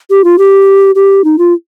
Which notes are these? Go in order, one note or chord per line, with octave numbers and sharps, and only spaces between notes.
G4
F4
G4
G4
D#4
F4